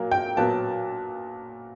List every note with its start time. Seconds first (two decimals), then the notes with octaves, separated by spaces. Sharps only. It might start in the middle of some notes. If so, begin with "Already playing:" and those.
Already playing: A#2 F#3 A#3
0.12 G5
0.37 A#2 F#3 B3 A5